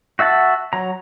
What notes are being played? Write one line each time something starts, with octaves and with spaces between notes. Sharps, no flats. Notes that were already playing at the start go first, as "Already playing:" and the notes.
F#4 E5 F#5 A5
F#3 A#5